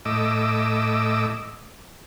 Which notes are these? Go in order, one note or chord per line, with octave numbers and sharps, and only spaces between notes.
A2 D#5 D6 E6